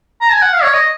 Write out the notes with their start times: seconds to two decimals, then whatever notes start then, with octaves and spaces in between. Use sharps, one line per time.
0.21 A#5
0.32 G#5
0.42 F#5
0.53 F5
0.63 C#5
0.74 D#5